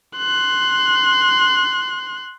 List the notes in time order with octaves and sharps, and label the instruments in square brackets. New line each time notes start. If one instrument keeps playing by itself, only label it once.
[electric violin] C6 F#6